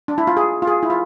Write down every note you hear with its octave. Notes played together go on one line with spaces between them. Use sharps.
D4
E4
F4
G#4
F4
G#4
E4
F4